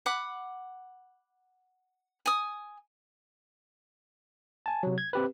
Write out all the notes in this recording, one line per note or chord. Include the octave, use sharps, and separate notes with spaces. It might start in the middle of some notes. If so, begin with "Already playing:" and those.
F#5 B5 D6
G#5 D#6
G#5 A5
C3 F#3
G#6
C4 G4 B4